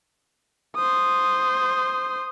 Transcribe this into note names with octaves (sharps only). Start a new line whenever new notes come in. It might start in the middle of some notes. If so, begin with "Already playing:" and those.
C5 D#6